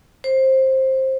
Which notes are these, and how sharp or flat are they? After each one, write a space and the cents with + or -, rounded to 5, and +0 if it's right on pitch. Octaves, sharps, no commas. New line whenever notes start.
C5 +15